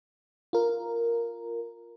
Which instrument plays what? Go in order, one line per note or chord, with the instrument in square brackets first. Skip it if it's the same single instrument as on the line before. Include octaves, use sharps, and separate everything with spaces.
[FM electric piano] F4 A#4